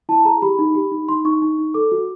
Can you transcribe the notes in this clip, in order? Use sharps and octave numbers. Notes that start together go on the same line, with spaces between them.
E4 A5
G#4 A#5
G4 B5
D#4
G4
D#4
D#4 C6
D#4 C#6
D#4
D#4
A4 D6
F#4